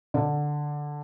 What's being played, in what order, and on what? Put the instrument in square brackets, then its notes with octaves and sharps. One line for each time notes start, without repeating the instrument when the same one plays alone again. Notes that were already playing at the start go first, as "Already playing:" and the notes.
[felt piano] D3